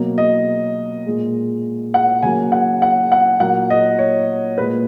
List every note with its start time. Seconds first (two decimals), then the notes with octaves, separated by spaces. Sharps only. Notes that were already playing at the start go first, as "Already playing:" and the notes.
Already playing: B2 F#3 A#3
0.18 D#5
1.06 A#2 G#3
1.94 F#5
2.22 C#3 F#3 A#3 G#5
2.52 F#5
2.82 F#5
3.12 F#5
3.40 A#2 F#3 A#3 F#5
3.70 D#5
3.99 C#5
4.58 A#2 G#3 B4